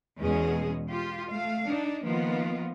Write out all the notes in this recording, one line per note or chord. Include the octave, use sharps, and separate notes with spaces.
E2 B2 G#3 C#4 G#4
F4 G4
A3 F5
D4 D#4
D#3 F3 A#3 B3 F4